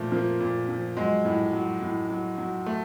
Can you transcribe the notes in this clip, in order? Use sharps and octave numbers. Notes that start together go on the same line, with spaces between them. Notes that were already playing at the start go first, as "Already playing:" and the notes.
Already playing: A#2 F3 A3
F3 A#3
A#2
F3
F#3 G#3
A2
F#3
A2
F#3
F#3
A3